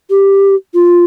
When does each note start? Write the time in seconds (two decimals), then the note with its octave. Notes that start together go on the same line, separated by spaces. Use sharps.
0.10 G4
0.74 F4